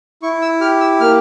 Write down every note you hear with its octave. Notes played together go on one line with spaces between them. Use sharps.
E4 C#6
E6
G4 F6
E6
A#3 F6